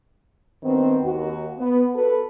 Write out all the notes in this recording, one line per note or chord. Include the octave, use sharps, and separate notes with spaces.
G2 D#3 B3 C4
D#2 F#4
B3
F#4 A4 B4